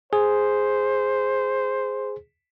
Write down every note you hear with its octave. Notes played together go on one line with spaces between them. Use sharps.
G#4 C5